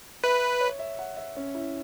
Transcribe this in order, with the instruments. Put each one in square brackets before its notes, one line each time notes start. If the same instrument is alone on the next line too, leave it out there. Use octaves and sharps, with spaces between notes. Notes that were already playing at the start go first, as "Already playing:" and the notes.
[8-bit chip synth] B4 [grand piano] E5
[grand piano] C#5
E5
F#5
E5
C#4
E4